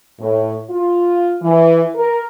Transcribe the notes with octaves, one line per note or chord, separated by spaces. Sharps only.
A2
F4
E3
A#4